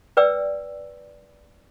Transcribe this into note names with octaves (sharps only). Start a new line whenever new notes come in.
B4 D5 G5 E6